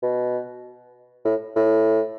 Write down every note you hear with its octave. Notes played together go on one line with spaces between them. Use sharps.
B2
A2
A2